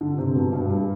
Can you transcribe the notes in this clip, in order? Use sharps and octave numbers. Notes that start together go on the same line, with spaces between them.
D3
C3
B2
G2
G2